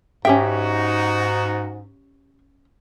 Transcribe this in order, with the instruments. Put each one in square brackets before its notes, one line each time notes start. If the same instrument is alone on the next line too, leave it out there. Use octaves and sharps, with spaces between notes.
[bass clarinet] G#2 [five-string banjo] C#4 G5 [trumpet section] D#4 F#4 [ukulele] G4 E5